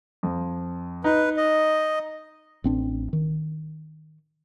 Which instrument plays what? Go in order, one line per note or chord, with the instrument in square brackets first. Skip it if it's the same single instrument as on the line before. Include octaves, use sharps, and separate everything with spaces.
[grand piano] F2
[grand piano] D#4 [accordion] B4
[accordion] D#5
[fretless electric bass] A1 C4 D4
D#3